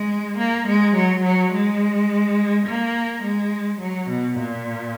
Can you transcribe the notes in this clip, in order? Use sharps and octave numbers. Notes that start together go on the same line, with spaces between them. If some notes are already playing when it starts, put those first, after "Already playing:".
Already playing: G#3
A#3
G#3
F#3
F#3
G#3
A#3
G#3
F#3
B2
A#2